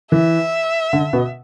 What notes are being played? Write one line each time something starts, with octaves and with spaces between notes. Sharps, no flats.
E3 E5
D3
B2 B3